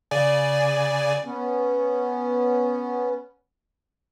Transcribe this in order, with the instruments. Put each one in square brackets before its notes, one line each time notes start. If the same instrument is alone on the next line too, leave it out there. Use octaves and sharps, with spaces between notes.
[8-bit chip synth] C#3 D5 G#5
[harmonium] B3 C#4